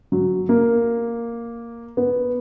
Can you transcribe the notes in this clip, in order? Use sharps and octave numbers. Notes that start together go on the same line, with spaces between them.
F#3
A#3
B3